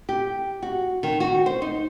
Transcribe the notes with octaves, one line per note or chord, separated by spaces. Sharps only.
G4
F#4
D#3
F#4
C5
D#4